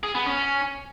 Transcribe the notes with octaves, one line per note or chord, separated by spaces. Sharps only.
G#4
B3
C#4